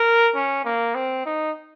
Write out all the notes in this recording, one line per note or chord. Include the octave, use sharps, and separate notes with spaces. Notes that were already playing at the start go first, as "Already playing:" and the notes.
Already playing: A#4
C#4
A#3
C4
D#4